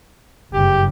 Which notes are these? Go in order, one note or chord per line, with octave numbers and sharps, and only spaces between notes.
F#1 G2 C#3 G4